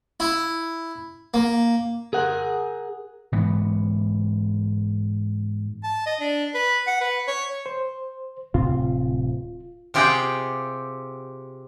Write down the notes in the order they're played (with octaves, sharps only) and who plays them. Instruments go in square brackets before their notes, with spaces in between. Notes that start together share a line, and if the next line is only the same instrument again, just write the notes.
[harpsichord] E4
A#3
[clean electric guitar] G#4 A#4 F#5
[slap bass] G#2 E3 B3
[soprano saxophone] A5
D#5
D4
B4
F#5
B4
C#5
[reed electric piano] C5
[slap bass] D1 C3 C4 [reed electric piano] F4
[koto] C3 F4 G4 G#4 F#5 G5